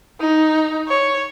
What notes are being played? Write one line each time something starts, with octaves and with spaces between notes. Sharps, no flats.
D#4
C#5